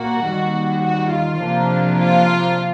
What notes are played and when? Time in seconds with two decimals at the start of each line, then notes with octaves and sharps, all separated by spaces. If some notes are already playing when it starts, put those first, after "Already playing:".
Already playing: A#2 A#3 F#4
0.25 D#2 D#3 G3
0.83 F#4
1.12 F4
1.40 C3 F3 A#3 D4
1.98 F4